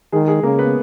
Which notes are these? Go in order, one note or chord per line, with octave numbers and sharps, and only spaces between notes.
D#3 G#3 G#4
G#3 G#4
C#3 A#3 A#4
B3 B4